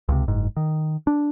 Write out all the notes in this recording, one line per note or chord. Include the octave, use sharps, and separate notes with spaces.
C#2 C3
F#1 G#2
D#3
D4